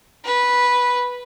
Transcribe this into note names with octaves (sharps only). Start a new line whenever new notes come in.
B4